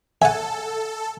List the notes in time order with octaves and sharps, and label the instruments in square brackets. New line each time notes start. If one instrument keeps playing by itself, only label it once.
[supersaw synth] A4 [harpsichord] E5 F#5 [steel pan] G#5